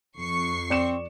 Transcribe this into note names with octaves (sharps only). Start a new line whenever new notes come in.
F2 C#6 C7
C4 D5 C#7 E7